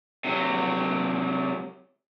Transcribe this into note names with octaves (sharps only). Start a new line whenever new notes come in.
C3 F#3